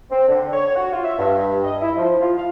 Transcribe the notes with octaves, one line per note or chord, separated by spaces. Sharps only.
C4
D3
C#5
F#4
F4
E5
G2
D#5
E4
F3
F4
F5